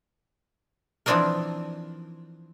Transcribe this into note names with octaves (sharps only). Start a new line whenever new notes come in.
E3 F3 C4 D4 D#4 A#4